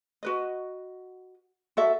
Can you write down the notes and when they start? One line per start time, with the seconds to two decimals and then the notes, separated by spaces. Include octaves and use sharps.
0.23 F#4 B4 D#5
1.77 F#4 A4 E5